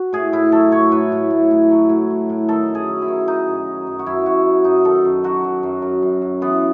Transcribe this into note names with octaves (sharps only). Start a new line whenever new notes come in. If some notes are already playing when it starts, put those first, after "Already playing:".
Already playing: F#4
A2 G#4
A2 E4
F#3 A4
A2 C#5
A2 B4
A2
A2
A2
F#3
A2
F#3
A2
D#3 A4
F#2
G#4
F#3
E4
D#3
D#3 D#4
F#2
F#3
F#2
F#4
F#2 E4
F#2 F#4
F#3
F#2 D#4
D#3 A4
F#2
F#3 F#4
F#3
F#2
F#2
F#2
F#2
E3 B3